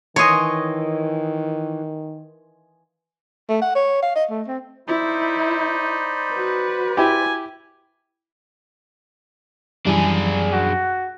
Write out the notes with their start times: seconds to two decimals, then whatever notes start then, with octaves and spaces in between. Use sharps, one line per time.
0.16 D#3 E3 C#5 D#5 G#5 C6 D#6
3.49 A3
3.62 F#5
3.75 C#5
4.02 F5
4.15 D#5
4.30 A3
4.48 C4
4.88 D#4 E4 C5 D5 B5
6.32 F#4 B4
6.97 E4 G4 G#5
9.87 F#2 E3 G3 D4 G#4
10.52 F#4